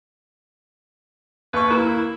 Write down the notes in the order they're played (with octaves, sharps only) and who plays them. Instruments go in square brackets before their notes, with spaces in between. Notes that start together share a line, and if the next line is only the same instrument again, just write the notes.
[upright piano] D#2 C#6 [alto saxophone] B4
[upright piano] A#3 [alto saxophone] E4